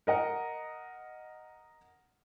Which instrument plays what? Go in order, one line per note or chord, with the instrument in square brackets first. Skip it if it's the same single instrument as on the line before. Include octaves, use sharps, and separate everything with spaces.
[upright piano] A#4 D#5 F#5